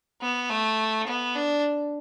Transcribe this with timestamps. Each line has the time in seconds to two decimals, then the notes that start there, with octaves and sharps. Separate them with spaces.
0.21 B3
0.50 A3
1.07 B3
1.36 D4